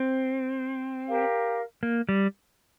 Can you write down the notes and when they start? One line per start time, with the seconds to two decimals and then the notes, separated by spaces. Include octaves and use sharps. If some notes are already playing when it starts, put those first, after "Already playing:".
Already playing: C4
1.06 G4 A#4 F5
1.83 A#3
2.09 G3